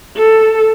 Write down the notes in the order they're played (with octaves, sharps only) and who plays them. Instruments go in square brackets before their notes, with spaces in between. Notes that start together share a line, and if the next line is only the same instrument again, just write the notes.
[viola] A4